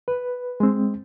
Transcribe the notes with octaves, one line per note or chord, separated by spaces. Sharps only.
B4
G#3 C4